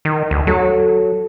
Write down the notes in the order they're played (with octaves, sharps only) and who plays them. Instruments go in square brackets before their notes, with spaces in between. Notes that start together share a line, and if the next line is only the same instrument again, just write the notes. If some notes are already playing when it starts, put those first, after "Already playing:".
[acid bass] D#3
D2
[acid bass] F#3 [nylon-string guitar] A4